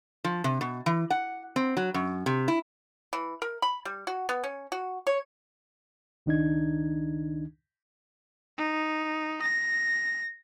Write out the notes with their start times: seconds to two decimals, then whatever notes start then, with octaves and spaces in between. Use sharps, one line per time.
0.24 F3
0.44 C3
0.61 B2
0.86 E3
1.10 F#5
1.56 C4
1.77 F#3
1.94 F#2
2.26 C3
2.48 E4
3.13 E3
3.42 A#4
3.62 B5
3.85 G3
4.07 F#4
4.29 B3
4.44 C#4
4.72 F#4
5.07 C#5
6.26 C#2 D#3 D4 D#4 G#6
8.58 D#4
9.42 A#6